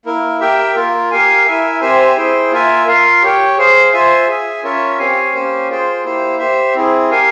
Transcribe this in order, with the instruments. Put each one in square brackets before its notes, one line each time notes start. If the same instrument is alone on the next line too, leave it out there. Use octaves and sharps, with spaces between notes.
[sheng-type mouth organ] A#3 E4 A#4
G4 A#4 E5 G5
A#3 F4 A#4
G4 A#4 F5 G#5
E4 A#4 E5 G#5
C4 G4 C5 E5 G#5
E4 G#4 C5 G5
A#3 F4 A#4 E5 G#5
F4 A#4 F5
G4 C#5 G5
G#4 C5 F5
F4 C5 E5 G#5
G#4 E5 G#5
C#4 F4 A#4 C#5 E5
C4 G4 C#5 F5 G#5
A#3 C#4 G4 C5
F4 G#4 C5 G5
A#3 E4 G4 C5
G4 C5 E5
C4 E4 G#4
G4 A#4 F5 G#5